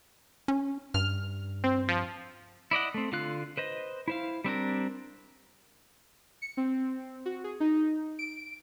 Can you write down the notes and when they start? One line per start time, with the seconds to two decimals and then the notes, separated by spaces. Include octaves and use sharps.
0.48 C#4
0.94 G2 F6
1.64 C4
1.88 F3
2.71 E4 D5 D#5 F#5
2.94 A3 C4
3.12 D3 F4 F5 F#6
3.57 B4 C5 D#5
4.08 E4 C5 F5
4.44 G3 C4 D4 A#4
6.42 C#7
6.57 C4
7.26 F#4
7.44 G#4
7.60 D#4
8.19 D7